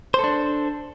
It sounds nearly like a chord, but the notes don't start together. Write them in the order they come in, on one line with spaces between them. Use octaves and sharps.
C5 A4 D4